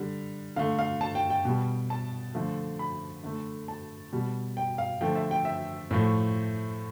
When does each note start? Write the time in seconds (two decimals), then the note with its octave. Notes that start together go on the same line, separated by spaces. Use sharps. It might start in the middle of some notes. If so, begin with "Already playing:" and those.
Already playing: D3 G3
0.56 D3 A3 F5
0.79 F5
1.01 A5
1.15 G5
1.30 G5
1.45 B2 G3
1.90 A5
2.34 D3 F3 A3
2.79 B5
3.24 D3 A3
3.68 A5
4.13 B2 G3
4.57 G5
4.78 F5
5.01 D3 F3 A3 G5
5.15 E5
5.31 G5
5.45 E5
5.91 A2 F3 A3